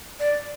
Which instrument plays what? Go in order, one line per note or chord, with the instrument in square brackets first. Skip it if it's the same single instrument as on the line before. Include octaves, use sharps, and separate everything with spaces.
[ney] D5